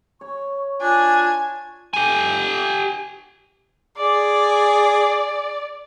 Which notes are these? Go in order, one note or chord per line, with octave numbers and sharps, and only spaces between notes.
C#5 C#6
D4 F4 G#5
G4 G#5
G#4 D5